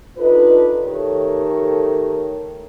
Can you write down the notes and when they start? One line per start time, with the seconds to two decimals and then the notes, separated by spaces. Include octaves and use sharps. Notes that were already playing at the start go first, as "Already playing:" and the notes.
0.18 D4 D#4 F4 A4 B4
0.83 D#3 A3 G4 A4 A#4 C#5